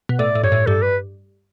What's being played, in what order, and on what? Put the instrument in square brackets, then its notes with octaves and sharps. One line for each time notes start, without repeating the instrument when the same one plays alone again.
[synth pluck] B2
[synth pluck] A2 [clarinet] D5
[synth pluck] A2
[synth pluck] G2 [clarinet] C#5
[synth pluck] A2
[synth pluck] G2 [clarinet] A4
[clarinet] B4